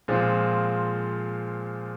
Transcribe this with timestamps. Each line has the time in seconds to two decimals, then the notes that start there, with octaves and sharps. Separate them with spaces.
0.08 A#2 F3 G#3 C4